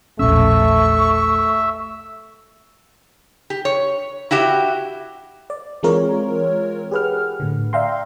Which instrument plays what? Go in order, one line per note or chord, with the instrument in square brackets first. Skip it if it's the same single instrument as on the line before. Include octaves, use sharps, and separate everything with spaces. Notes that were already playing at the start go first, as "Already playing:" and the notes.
[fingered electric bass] E1 A#1 C#4 [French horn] A3 [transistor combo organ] E5 [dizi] C#6
[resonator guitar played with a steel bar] G4
C#5
E4 F#4 G4 E5
[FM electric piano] D5
E3 G#3 C4 F4 A#4 C#5
G4 G#4 B4 F#5 F6
A2 D3
D5 E5 F5 G5 A#5 C6